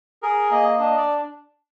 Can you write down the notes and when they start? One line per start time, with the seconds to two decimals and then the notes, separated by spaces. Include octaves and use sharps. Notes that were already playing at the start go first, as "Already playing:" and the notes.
0.23 G#4 A#4
0.51 A#3 D#5
0.79 D4 D#5
0.97 D5